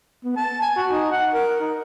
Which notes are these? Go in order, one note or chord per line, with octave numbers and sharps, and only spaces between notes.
B3
A5
G#5
F#4
D#4
F#5
A#4
D#4